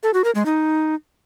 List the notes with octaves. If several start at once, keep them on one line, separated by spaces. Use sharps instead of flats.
A4
F#4
A#4
G#3
D#4